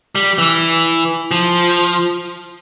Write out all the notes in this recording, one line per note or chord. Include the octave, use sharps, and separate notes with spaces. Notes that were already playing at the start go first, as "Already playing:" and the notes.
G3
E3
F3